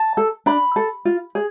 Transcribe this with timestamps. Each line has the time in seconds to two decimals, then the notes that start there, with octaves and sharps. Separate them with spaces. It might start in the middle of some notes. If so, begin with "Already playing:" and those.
Already playing: A5
0.17 A4
0.46 D4 B5
0.76 A4
1.05 F4
1.35 G#4